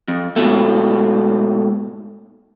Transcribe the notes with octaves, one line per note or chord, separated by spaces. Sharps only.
F2
G#2 B2 A3